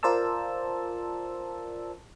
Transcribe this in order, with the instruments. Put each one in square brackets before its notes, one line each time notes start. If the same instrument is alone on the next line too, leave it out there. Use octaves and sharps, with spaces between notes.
[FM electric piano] F4 A#4 C5 D5 A5 E6